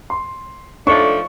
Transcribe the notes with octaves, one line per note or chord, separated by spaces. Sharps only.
C6
F3 A3 D4 D#4 A4 C#5 C#6